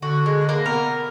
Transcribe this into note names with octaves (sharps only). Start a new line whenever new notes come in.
D3 F#4
G#3
A#3
B3 A#4